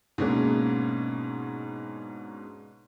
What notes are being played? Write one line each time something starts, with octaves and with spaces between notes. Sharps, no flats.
G#2 B2 A#3 C#4 D4 G#4